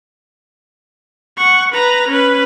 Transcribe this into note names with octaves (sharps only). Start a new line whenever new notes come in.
F#5 C#6
B4 A#5
C#4 B4